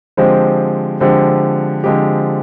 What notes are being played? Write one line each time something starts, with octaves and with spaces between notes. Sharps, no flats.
D3 F3 G#3 C4 G4
D3 F3 G#3 C4 G4
D3 F3 G#3 C4 G4